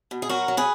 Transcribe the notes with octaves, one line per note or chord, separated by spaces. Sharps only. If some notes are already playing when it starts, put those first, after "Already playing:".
B2
G#4
F#3 F#4 A#4
F#3
G#4 B4